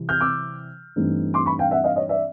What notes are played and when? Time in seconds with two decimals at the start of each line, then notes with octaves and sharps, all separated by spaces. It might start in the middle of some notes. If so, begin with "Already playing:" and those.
Already playing: C3 E3 G3
0.09 F6 G6
0.21 D6 E6
0.96 G2 E3 A3 C4 D#4
1.34 C6 D6
1.46 B5 C#6
1.59 F5 G5
1.71 E5 F#5
1.84 D#5 F5
1.96 C#5 D#5
2.09 D5 E5